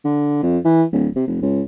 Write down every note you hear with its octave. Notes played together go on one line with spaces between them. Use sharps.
D3
F2
E3
D1
C3
F1
C#2